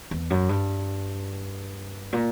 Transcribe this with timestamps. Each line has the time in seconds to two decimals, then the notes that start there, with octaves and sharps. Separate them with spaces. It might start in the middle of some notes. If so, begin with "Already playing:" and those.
0.11 E2
0.30 F#2
0.49 G2
2.13 A#2